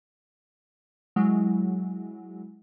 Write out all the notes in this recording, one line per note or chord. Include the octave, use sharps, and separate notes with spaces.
F#3 G#3 E4